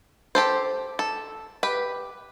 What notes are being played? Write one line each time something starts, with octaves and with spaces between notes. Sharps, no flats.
G4 A4 C5
A4
G4 B4